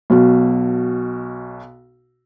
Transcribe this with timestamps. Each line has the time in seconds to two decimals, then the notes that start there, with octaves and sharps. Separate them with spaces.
0.10 B1 B2